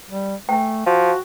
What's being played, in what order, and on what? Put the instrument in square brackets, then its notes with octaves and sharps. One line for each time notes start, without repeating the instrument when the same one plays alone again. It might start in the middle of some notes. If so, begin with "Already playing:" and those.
[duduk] G3
[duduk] A3 [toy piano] G5 G#5
[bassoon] F3 [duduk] F#4